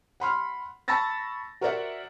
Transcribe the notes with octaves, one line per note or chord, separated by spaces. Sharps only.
F#5 B5 C6 F6
A5 B5 C#6 E6 A6 A#6
F#4 A#4 C5 D5 E5 F#5